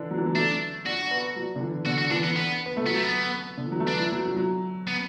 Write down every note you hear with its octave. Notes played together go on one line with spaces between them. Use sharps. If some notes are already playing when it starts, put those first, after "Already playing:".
Already playing: D3 E3 D4
F#3
E3
F#3
A3 D4
D4 F#4
B3
F#3
D3
E3
D3 F#4
F#4
E3 D4
B3
B3
B3
A3
F#3 B3
A3
B3
D3
E3
F#3
A3
B3 D4
E4
F#3
F#3
F#3
B3